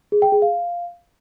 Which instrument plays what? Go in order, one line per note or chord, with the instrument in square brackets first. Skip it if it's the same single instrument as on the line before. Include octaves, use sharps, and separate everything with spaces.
[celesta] G#4
G5
G#4
F5